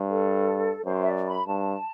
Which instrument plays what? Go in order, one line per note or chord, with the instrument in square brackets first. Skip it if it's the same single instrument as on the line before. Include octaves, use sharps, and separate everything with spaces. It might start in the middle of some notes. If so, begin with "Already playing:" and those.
Already playing: [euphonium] G2
[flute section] A4
[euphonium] F#2 [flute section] C5
[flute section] E5
D5
B5
[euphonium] G2 [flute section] A5